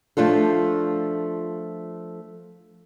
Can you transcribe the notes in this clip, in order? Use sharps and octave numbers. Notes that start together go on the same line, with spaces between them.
F3 A3 D4 F4 A4